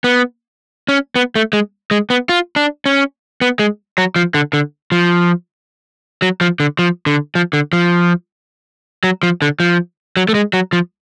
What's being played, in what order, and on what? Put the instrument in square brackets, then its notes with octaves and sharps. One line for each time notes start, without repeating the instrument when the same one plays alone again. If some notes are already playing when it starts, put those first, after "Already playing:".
[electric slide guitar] B3
C#4
B3
A3
G#3
G#3
B3
F4
D4
C#4
B3
G#3
F#3
F3
D3
D3
F3
F#3
F3
D3
F3
D3
F3
D3
F3
F#3
F3
D3
F3
F#3
A3
G#3
F#3
F3